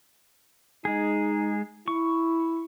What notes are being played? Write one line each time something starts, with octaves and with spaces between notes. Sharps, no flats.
G#3 D#4 G#4
E4 C#6